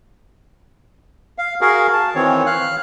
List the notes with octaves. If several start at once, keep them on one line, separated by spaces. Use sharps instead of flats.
F5
F#4 G#4 A#4 F5
A5
D#3 E3 C4 C#5
F5 F6 F#6